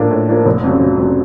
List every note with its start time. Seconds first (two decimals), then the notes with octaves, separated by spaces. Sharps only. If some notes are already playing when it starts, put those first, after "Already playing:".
Already playing: A2 F3 A#3 D4
0.11 A2
0.29 F3 A#3 D4
0.46 F1
0.64 F2 C#3 F#3
0.81 F1
0.98 F2 C#3 F#3